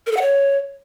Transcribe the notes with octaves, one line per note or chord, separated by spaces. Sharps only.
A#4
A4
F#5
C#5